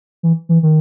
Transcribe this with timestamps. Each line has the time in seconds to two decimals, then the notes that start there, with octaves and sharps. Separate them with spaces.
0.23 E3
0.49 E3
0.63 D#3